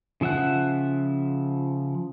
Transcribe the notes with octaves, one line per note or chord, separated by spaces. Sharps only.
C#3 F3 E5 F#5 F#6